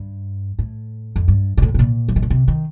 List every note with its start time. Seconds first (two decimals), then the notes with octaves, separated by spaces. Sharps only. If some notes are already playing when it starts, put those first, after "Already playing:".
Already playing: G2
0.59 A2
1.16 F2
1.28 G2
1.57 A#2
1.62 A2
1.74 C3
1.79 A#2
2.08 F3
2.16 D#3
2.22 D3
2.30 C3
2.48 D#3